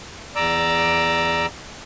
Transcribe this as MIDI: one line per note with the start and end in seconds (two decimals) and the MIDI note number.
0.36 1.46 40
0.36 1.46 74
0.36 1.46 82
0.36 1.46 86
0.36 1.46 88